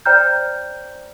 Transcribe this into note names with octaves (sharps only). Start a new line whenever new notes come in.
C5 D5 G5 A#5 F6 G6